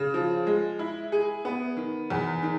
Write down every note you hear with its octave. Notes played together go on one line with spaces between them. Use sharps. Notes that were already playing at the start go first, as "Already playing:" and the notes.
Already playing: C#3
F3
G#3
E4
G#4
B3
D#3
E2
D#3